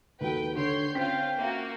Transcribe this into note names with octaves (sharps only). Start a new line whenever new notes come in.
D#2 F#3 A4 B4 G5
D3 C#5 C6 G6
C4 C#4 F4 F5 G5 B6
A#3 F#4 E5